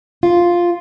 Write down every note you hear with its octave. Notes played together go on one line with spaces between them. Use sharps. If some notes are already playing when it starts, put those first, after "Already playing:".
F4